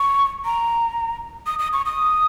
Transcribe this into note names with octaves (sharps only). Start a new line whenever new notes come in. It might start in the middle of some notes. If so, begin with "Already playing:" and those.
Already playing: C#6
A#5
D#6
D#6
C#6
D#6